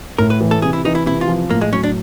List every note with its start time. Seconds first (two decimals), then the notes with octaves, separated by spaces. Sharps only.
0.19 A2 A#4
0.30 B4
0.41 E3
0.51 A4
0.62 C3 G#4
0.73 E4
0.85 E3 D#4
0.95 E4
1.06 C3 E4
1.21 F4
1.28 F3
1.50 A2 A#3
1.61 G#3
1.72 F#3 C#4
1.83 D4